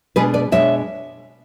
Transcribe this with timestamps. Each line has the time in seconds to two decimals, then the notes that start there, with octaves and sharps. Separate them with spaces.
0.16 B2 G#3 D4 G#4 B4
0.34 B4 D5
0.52 B2 G#3 D4 C#5 E5